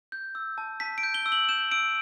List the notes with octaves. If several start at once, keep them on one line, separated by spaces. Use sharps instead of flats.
G6
E6
A5
A5 B6
D7
G6
G7
E6
F#7
G6 E7
E6 D7